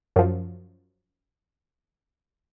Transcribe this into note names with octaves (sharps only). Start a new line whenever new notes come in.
F#2 F3